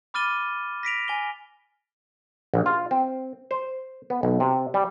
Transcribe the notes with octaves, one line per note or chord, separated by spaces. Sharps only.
B5 D6 F6 A6 D#7 G7
A#6 B6 D7 F7
G#5 G7
A#1
F4
C4
C5
B3
B1
C3
G3